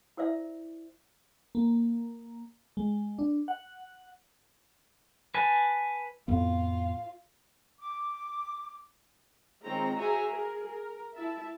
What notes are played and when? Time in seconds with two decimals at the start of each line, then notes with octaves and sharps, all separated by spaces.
0.17 E4 A#4 C5 D5 E5
1.55 A#3
2.77 G#3
3.19 D4
3.48 F#5
5.35 B4 G#5 A5
6.28 F2 A2 B3 F4 F5
7.79 D6
9.64 D#3 G#3 C4 F4 C#5 A#5
9.97 F#4 G#4 C5 E5 G#5 A#5
10.29 G#4 A#4
10.67 A#4
11.15 E4 E5 A5